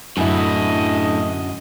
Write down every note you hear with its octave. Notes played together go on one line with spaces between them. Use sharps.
F#2 A2 D3 E4 D#5